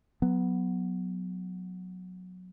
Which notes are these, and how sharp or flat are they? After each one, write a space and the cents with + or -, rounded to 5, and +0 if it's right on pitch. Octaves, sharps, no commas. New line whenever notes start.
F#3 -15 B3 +0